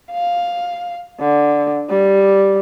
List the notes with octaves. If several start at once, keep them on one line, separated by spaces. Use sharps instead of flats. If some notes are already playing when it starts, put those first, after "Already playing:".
F5
D3
G3